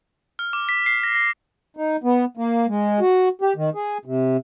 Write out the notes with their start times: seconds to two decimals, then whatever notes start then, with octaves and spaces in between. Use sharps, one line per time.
0.39 F6
0.53 D6
0.69 B6
0.86 C7
1.03 A#6
1.15 A#6
1.77 D#4
2.04 B3
2.37 A#3
2.68 G#3
3.00 F#4
3.41 G4
3.56 D#3
3.75 G#4
4.05 C3